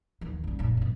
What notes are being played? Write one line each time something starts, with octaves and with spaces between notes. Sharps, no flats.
D#2 D#3
G3 C#4
F1 A#2
G2 B2